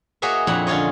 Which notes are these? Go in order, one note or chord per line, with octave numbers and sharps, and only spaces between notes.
A#3 F#4 G#4 C#5 D#5 E5
F2 A#2 D4 E4 F#5 A#5
D3 C#4 F4 C#5 D#5